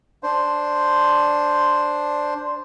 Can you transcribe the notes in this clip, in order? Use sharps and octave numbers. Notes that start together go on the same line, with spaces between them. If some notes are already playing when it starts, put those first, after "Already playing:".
D4 C5